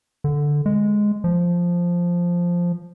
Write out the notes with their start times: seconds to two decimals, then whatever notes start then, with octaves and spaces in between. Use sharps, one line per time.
0.24 D3
0.66 G#3
1.24 F3